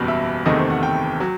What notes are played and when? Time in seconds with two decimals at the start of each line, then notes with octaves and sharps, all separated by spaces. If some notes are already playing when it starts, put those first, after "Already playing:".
Already playing: F#1 E2 B2 G3
0.08 E5
0.45 F#1 E2 C3 D#3 A3 D#5
0.58 C5
0.70 F#5
0.83 G5
1.20 F#3